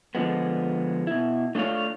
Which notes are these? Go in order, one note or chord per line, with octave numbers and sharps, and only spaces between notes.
D3 F3 G#3 B3
B2 E4
A3 D4 F4 G4 C#5 F5